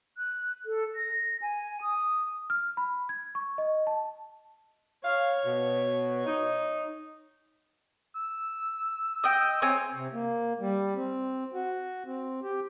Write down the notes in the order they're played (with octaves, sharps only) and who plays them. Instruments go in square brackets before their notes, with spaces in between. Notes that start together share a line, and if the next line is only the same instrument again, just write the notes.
[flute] F#6
A4
A#6
G#5
D#6
[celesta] F6
B5
G#6
C#6
D#5
A5
[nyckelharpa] C#5 [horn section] F5
[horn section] B2
D#4
[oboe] E6
[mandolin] D#5 G5
[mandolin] C4 G#5 [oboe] C#5
[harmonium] C3
A#3
G3
C4
F#4
C4
G4